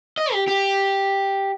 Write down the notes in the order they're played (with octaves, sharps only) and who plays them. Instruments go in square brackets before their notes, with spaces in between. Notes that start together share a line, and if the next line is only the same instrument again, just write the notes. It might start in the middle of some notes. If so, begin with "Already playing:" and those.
[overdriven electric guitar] D#5
G4
G4